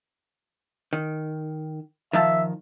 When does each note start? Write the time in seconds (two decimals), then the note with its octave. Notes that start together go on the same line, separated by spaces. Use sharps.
0.93 D#3
2.13 D#3 F3 E5 A5